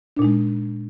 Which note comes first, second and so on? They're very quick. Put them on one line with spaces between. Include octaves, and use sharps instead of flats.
D4 A#2 D#4 G#3